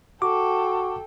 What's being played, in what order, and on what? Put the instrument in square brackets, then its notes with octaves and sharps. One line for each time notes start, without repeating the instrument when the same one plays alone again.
[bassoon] F#4 [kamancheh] A4 G5 [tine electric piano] D6